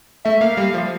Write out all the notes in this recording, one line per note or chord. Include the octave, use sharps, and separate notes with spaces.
A3 E5
A#3 F5
G3 F5
F3